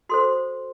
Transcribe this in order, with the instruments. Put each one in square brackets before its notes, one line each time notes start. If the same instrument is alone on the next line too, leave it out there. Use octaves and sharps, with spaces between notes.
[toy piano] F#4 A4 C5 C6